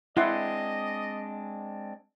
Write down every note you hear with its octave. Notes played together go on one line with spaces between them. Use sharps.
G#3 C4 D4 E4 D#5 F#5 C6